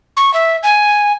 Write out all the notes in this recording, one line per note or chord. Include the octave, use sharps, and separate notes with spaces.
C#6
E5
G#5